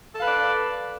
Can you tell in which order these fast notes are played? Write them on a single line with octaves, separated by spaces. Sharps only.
A4 F5 B4 D5